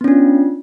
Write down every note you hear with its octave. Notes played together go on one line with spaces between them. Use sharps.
B3 C#4 D4 F4